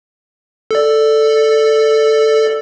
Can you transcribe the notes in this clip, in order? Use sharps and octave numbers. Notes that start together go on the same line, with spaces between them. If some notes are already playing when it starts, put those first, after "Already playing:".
A4 D5